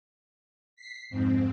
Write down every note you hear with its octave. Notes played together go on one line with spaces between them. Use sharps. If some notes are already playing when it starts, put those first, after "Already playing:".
B6 C7
F2 G#2 C4